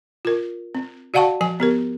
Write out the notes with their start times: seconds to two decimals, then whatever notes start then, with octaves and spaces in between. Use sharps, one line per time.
0.25 F4 A#4
0.75 C4
1.14 F#4 D5 F5 F#5 A5 C#6
1.41 F3 G#5
1.60 B3 G4 A#4